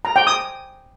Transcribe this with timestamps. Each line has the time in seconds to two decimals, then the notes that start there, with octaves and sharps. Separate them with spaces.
0.05 A#5
0.16 G5
0.27 D#6